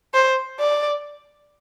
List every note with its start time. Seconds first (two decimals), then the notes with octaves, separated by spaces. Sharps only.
0.14 C5
0.59 D5